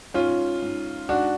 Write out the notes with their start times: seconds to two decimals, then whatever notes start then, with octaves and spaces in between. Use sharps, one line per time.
0.14 G#2 C#4 F4
0.62 G#2
1.09 G#2 D4 F#4